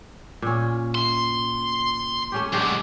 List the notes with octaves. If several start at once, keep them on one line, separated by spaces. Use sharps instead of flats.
A#2 C#4
E5 C6
A3 C#4 G4
F#3 G#3 D4 G4